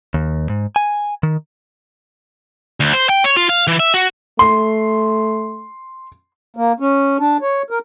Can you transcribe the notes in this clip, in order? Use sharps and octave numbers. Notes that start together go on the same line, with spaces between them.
D#2
G#2
G#5
D#3
D2
C5
G5
C#5
F4
F5
E3
E5
F#4
A3 C6
A#3
C#4
D4
C#5
A#4